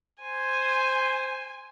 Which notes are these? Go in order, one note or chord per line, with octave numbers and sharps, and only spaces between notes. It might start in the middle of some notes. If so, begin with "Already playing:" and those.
C5 G#5